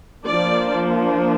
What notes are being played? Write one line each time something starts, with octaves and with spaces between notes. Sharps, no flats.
F3 A#3 D4 D5